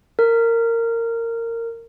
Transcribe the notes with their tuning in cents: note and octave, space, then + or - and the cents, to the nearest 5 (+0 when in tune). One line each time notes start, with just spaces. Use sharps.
A#4 -20